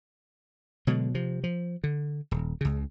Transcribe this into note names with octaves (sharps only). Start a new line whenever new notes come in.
B2 D3 F#3 G#3
C3 F3
F3
D3
D#1
C#2 C#3